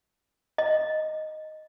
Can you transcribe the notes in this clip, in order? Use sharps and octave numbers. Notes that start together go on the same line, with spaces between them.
D#5